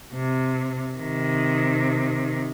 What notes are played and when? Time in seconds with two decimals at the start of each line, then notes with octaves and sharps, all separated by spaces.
0.14 C3
0.98 C3 D#3